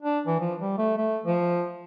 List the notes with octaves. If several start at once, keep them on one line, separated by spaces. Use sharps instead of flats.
D4
E3
F3
G3
A3
A3
F3